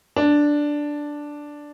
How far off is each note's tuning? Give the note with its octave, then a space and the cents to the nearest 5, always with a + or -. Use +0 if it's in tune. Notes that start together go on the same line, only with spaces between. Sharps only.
D4 +0